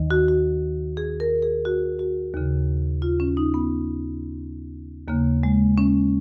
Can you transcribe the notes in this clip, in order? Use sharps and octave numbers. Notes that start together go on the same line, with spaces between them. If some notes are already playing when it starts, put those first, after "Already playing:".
Already playing: D#2 D#3
F#4
F#4
G#4
A#4
G#4
F#4
F#4
D#2 C#3
F4
C#4
D#4
B3
D#2 C#3 A#3
G#3
C#4